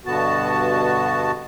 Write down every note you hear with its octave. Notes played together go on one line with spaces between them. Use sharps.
G2 B2 D3 B3 F#4 A5